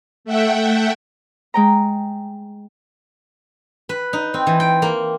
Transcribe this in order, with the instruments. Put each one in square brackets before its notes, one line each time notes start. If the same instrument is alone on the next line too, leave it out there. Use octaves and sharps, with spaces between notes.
[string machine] A3 E5 F#5 G5
[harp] G#3 G5 A#5
[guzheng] B4
D#4
C4
E3
G5
A#3